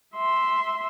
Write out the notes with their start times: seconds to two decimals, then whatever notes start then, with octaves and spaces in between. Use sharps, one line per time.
0.15 E5 C6